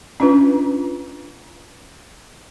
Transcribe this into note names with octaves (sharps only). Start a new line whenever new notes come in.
C#4 D4 F4 B4